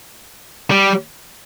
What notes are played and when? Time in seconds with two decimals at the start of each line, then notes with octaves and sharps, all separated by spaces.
0.71 G3